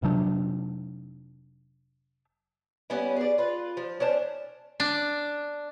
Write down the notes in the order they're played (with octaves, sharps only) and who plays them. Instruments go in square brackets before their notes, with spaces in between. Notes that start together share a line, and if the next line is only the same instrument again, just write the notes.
[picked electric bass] F1 C3 F#3 D4
[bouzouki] G3 B3 C#4 E4
G#4 D5
F4 B4
F3
C#4 D4 C5 A5
[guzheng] D4